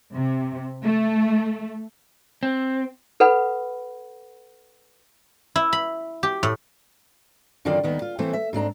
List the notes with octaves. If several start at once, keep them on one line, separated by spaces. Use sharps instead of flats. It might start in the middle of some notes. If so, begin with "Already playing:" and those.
C3
A3
C4
A4 B4 F#5 B5
E4
B5
G4
A2
F#2 D3 D#3 C4 F4 D5
D#2 D#3 B3
F4
E3 A3 C4 C5
E5
G#2 C4 D4 A#5